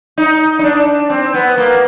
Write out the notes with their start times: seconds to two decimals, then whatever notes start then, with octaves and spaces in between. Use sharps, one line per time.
0.17 D#4
0.59 D#4
0.64 D4
1.10 C4
1.34 B3
1.57 A#3